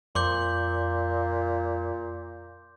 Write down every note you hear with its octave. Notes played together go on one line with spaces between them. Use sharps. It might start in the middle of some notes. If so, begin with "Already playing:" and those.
F2 A#2 C6 D6 G6